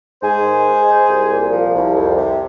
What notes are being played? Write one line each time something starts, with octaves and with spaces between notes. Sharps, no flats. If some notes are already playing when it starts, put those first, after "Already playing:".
G#2 G#4 C5
D#3
G#3
G#2
C2
A#2
F3
C2
F2
C3